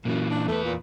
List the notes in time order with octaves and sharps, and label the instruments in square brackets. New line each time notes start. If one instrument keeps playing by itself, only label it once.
[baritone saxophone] F#2 [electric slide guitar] A#2 E3
[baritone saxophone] D4
[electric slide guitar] E2 B4 [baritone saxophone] A3
[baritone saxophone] A#2